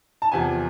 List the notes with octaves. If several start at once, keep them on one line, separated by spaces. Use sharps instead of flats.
A5
E2 C3 F3 G#5